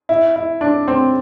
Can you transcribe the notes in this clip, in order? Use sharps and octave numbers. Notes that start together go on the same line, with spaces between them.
E4
E4
D4
C4